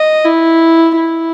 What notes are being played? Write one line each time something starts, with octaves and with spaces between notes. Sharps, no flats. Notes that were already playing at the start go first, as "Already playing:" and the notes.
Already playing: D#5
E4
E4